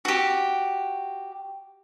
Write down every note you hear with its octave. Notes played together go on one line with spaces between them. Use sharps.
F#4 G4